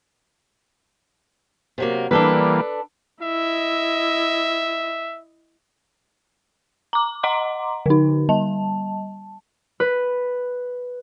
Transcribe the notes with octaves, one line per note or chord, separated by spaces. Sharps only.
C3 F#3 A#3
E3 G3 A#3 D4 A4 B4
E4 D#5 E5
A#5 D6
D#5 F#5 A#5 C6 D6
D3 D#4
G3 A5
B4